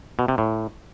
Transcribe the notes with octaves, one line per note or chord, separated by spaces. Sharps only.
B2
C3
A2